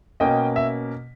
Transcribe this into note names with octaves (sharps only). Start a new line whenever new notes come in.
B2 A#3 C#4 D#5 G5
E5